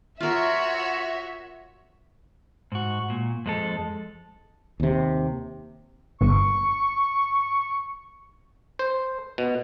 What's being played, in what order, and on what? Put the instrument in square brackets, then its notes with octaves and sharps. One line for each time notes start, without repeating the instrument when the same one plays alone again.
[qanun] F4 A#4 [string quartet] F#4 C#5 [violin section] E5
[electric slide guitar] G#2 F#4
A#2
F2 G#3 A4
[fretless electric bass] D#2 C3
[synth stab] G1 [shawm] C#6
[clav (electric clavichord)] C5
B2